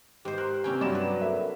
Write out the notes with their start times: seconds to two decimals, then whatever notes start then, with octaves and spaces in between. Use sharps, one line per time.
0.25 G#2 G4 C5
0.38 A#4 C6 F#6
0.64 C3 C4 C#4 G5 G#5
0.81 G2 F#3 E4 D5 E7
0.95 B4
1.21 D3 A#3 E5